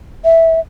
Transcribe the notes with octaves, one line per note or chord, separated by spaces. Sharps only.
E5